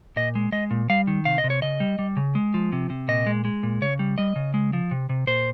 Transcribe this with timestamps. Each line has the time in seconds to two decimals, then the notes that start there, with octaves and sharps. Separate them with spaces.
0.16 A#2 D#5
0.35 G#3
0.52 G#3 D#5
0.71 A#2
0.90 G3 F5
1.07 D#3
1.25 C3 F5
1.38 D#5
1.44 C3
1.50 C#5
1.62 C#3 D#5
1.80 G3
1.99 G3
2.17 C#3
2.35 G#3
2.54 F3
2.73 C3
2.90 C3
3.08 A#2 D#5
3.26 G#3
3.45 G#3
3.63 A#2
3.81 C#3 C#5
3.99 G3
4.18 G3 D#5
4.36 C#3
4.54 G#3
4.73 F3
4.91 C3
5.09 C3
5.27 A#2 C5